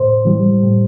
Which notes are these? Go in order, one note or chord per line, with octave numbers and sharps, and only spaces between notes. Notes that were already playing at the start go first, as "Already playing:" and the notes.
Already playing: A2 C5
E3 G3
A2